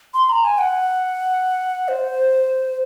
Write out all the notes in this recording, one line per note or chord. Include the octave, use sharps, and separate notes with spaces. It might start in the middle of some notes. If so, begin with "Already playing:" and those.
C6
A#5
G#5
F#5
C5